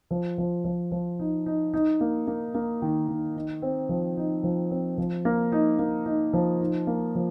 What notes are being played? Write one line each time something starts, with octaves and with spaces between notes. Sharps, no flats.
F3
F3
F3
F3
D#4
D#4
D#4
A#3
A#3
A#3
D#3
D#3
D#4
C4
F3
D#4
F3
C4
F3
A#3
D#4
A#3
D#4
F3
D#4
A#3
F3